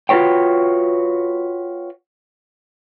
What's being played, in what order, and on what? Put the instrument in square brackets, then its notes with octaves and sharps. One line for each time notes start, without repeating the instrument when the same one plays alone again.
[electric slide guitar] F4 F#4 A#4 B4 C#5 G5